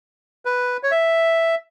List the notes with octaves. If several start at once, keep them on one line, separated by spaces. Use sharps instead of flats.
B4
C#5
E5